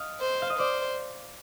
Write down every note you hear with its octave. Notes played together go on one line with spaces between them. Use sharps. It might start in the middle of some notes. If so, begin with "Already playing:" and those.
Already playing: D#5 F5
C5
F5
D#5
C5 D5